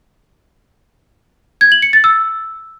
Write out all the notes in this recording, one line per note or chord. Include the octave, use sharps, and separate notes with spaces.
G#6
F#7
C#7
A6
E6